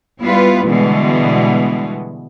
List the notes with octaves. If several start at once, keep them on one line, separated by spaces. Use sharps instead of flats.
G3 B3 E4 F4 B4
B2 D3 E3 G3 G#3